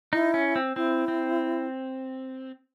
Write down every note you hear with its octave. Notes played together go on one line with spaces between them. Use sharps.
D#4 E4
C#4
C4
C4 E4
C4